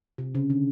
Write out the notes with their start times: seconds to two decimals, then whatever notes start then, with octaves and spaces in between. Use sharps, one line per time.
0.18 C3
0.35 C#3
0.50 D3